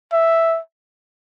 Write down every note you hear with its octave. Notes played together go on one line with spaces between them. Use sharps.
E5